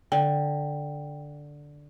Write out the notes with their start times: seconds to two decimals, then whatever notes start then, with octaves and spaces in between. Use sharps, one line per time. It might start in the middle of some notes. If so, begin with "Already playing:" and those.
0.12 D3 G5